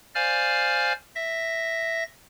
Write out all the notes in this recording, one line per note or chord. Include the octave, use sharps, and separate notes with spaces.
C5 D5 F5 G#5 F6
E5 A#6